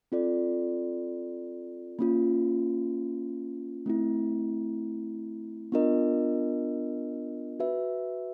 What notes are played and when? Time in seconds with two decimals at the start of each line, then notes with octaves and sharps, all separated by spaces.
0.12 C4 F4 A4 D5
1.99 A#3 C#4 F4
3.86 A3 C4 E4
5.72 B3 D4 F4 A#4 D#5
7.60 F#4 B4 E5